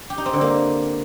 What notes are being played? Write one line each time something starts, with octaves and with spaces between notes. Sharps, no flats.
G4
D#4
C4
D3
A#3